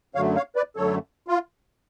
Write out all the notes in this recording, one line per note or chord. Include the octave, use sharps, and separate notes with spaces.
F#2 D3 F#3 A3 C#5 F5
C#5 F5
B4 D5
F#2 D3 F#3 A3 A4 C#5
F4